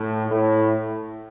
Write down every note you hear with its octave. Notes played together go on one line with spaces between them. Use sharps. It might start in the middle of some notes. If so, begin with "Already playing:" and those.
Already playing: A2
A2